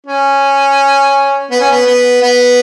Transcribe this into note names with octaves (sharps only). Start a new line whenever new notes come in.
C#4
B3
C#4
B3
B3
B3